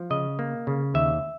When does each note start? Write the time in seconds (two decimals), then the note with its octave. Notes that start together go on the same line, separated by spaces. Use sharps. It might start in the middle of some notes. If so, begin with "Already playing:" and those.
Already playing: F3
0.10 C#3 D#5
0.39 A#3
0.67 C#3
0.94 D#2 E5